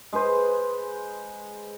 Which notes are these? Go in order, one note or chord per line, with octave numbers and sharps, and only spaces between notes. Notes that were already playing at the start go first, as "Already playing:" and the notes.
G#3 G#4 B4 C5